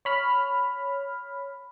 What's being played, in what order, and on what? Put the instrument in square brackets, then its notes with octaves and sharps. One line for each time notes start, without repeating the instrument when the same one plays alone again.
[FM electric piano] C#5 B5 F6